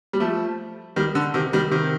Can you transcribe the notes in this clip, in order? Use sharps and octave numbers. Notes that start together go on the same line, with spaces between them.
G3
F3 A3
D#3 G3
D3
C3 D#3
D#3 G3
C3 D#3